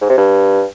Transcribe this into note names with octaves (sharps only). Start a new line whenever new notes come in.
G#2
C3
G2